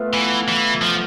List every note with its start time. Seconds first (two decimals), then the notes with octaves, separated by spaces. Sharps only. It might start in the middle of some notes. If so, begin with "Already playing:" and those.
Already playing: A3 B3 F4
0.13 E3
0.48 E3 F4
0.82 F3